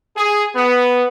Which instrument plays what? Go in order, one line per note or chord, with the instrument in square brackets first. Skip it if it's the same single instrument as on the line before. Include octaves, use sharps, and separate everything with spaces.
[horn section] G#4
B3